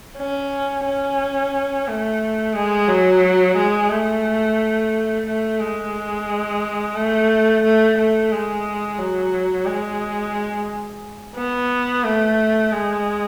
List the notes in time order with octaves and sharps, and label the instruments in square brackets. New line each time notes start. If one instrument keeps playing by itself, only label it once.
[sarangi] C#4
C#4
A3
G#3
F#3
G#3
A3
A3
G#3
A3
A3
A3
G#3
F#3
G#3
B3
A3
G#3